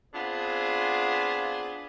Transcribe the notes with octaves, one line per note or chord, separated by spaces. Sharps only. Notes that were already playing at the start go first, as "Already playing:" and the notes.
B3 C4 D4 F4 G#4